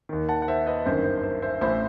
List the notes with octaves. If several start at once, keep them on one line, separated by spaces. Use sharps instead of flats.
D#2 D#3
F#5 A5
F#5
C5 E5
B4 D#5
G1 F#2 D#3 C5
C5
C5
C5 E5
A1 A2 E3 C5 E5